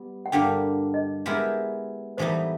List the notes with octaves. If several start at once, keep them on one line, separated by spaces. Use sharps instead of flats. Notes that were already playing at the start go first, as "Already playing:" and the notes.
Already playing: G3 B3
F#5
G2 D3 G3 A#3 D4 G5
D#5
G#3 B3 E4 G4 A#4
A2 E3 G3 B3 D#4 C5